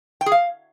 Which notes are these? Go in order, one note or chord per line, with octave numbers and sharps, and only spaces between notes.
G5
G#4
F5